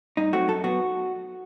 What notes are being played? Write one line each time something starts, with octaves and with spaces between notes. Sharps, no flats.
G2 D#4
F#3 A3 C4 F#4
F#2 A4
F#3 B3 F#4